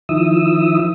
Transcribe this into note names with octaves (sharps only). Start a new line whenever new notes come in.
D#3 F3 E4 D#6 E6